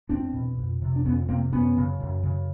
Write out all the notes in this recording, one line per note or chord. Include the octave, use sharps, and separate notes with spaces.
E2 C4 D4
B2
F2
C3
D4
F2 B3 C#4
C3 A#3 C4
F#2 B3 C#4
C#3
F#2
C#3